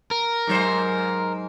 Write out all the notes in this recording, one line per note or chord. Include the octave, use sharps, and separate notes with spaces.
A#4
G#2 F#3 C5